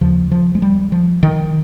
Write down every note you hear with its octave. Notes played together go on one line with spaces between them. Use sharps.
D#2 C#3 F3
F3
G#3
G3
F3
D#3